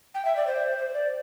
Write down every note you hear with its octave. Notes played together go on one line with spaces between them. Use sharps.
G5
E5
D5
C5
C5
D5